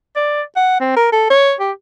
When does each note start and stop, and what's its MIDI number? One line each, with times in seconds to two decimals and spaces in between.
0.16 0.42 74
0.56 0.76 78
0.80 0.96 60
0.97 1.09 70
1.12 1.27 69
1.30 1.53 73
1.60 1.72 67